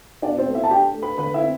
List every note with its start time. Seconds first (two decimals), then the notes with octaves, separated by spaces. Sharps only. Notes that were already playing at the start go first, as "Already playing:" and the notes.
0.22 B2 D4 D5
0.38 C4 C5
0.46 A3
0.55 E4 E5
0.63 A5
0.71 D4 G4 G5
0.94 A3
1.02 B4 B5
1.18 D3 B4 B5
1.34 E4 E5
1.42 C4